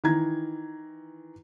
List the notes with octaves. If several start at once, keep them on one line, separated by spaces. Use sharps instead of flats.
D#3 E3 A#5 G#6